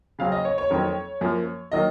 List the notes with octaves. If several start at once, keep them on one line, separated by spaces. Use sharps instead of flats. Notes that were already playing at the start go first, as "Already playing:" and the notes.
C#3 F#3 C4 F5
D#5
C#5
C#5
F2 D#3 F#3 C4
F#2 F3 A#3
D#3 F#3 A#3 D#5